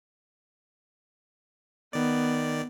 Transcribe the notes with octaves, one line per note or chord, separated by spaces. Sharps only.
D#3 B3 D5